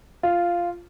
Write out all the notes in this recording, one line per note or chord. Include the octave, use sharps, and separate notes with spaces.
F4